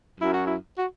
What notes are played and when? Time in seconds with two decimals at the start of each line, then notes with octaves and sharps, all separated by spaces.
0.20 F#2 E4
0.33 F#4
0.47 E4
0.78 F#4